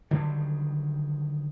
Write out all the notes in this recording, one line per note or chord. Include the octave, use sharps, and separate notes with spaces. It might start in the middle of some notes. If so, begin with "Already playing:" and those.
D3 D#3 F#3 G3